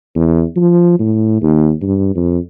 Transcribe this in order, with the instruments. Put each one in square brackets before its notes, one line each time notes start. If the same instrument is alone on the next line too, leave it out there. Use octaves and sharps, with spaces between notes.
[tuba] E2
F3
A2
D#2
G2
F2